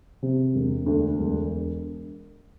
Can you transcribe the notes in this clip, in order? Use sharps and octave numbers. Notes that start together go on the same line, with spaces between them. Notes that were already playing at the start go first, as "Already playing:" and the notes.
C3
E1
D2
E1